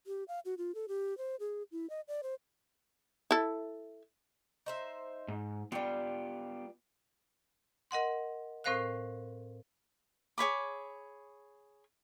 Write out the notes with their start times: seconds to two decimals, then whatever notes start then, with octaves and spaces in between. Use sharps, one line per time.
0.07 G4
0.28 F5
0.45 F#4
0.58 F4
0.75 A4
0.88 G4
1.18 C5
1.40 G#4
1.72 E4
1.90 D#5
2.08 D5
2.23 C5
3.31 E4 A4
4.66 D#4 C5 E5
5.28 G#2
5.72 G3 B3 F4 G4 G5
7.91 A#4 D#5 F#5 C6
8.64 A2 C4 A#4 C5 F5 F#6
10.38 G#4 C#5 B5 D6